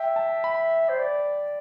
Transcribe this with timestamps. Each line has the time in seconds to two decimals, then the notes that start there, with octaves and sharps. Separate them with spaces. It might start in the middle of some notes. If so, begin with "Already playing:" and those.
Already playing: E5 G5
0.16 A5
0.44 B5
0.89 C5
0.99 D5